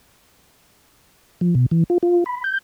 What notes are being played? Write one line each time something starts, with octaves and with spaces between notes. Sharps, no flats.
F3
B2
E3
F4
F4
B5
G6